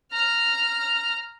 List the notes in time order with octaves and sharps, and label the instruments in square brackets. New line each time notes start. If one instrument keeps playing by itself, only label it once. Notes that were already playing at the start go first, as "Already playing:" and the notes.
[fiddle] A#5 F6